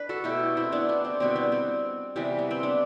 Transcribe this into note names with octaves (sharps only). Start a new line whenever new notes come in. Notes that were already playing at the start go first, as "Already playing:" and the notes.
Already playing: D4 B4
F#4 A4
B2 A3 E4 G4
C4 E4
B3 D4
B3
C4
B2 G3 B3 C4
B3
C4
C3 E3 G3 B3
B3
C4
B3 D4